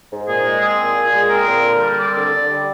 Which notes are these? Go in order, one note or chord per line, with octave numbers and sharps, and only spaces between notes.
G#2
A#2 G#4
G#3
C4 G#4
A#2
A#2
G#3
C4 A#4
A#2
D3
G3
C4 D5
D3
D3
G3